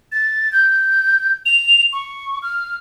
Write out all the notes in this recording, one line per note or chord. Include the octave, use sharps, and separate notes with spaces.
A6
G6
F7
C#6
F6